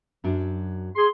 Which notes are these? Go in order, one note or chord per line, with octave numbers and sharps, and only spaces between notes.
F#2 F#3 D4
G#4 C6